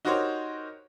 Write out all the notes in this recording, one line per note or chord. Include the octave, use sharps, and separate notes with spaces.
D#4 F#4 G4 A#4 C5 C#5